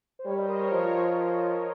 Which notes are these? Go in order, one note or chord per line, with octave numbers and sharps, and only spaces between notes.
C5
G3 A#4 C#5
C5 D#5
A#4 C#5
A#4 C#5
F3 A#4 C#5